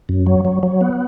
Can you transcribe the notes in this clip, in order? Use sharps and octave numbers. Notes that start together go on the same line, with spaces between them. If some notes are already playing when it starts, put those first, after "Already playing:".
F#2
F#3
F#3
F#3
B3